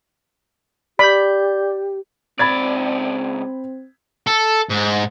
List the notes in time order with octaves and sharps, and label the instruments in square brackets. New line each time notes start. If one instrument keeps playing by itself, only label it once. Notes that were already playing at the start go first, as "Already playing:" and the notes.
[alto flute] G4 [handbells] D5 G6 [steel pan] B5
[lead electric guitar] C#2 D5 [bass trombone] C4 [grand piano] B5 G#6 A6
[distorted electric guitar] A4
G#2